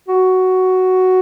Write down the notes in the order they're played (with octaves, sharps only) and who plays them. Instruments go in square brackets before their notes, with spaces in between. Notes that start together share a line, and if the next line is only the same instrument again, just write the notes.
[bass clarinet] F#4